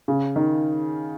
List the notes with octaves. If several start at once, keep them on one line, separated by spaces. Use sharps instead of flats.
C#3
D#3